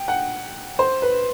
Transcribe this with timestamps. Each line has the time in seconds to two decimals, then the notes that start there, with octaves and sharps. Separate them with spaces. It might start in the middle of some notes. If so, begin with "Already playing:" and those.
Already playing: G5
0.08 F#5
0.79 C5
1.02 B4